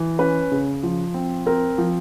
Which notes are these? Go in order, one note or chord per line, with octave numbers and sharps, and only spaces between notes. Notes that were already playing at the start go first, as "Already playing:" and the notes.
Already playing: E3
C#4 B4
C#3
F3
C4
C4 A#4
F3